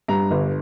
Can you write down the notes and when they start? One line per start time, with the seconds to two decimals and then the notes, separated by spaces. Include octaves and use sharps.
0.08 G2 A#5
0.31 G1